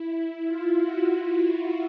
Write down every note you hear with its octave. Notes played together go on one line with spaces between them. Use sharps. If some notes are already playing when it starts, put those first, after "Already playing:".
Already playing: E4
F4
F#4